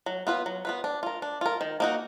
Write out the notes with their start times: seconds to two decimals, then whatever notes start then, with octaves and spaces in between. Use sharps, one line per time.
0.06 F#3
0.27 B3 F4 B4
0.46 F#3
0.65 B3 F4 B4
0.84 D4
1.03 F4 A#4
1.22 D4
1.41 F4 A#4
1.61 D#3
1.80 A#3 D#4 F#4